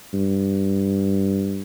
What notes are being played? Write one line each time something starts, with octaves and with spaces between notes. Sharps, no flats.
G2